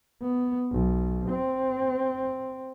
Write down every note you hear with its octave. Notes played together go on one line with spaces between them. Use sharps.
B3
B1
C4